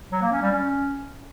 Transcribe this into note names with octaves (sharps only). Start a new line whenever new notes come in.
F#3
A#3
C#4
G3
C#4